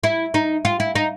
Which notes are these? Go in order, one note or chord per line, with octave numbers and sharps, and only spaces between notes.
E4
D#4
F4
E4
D#4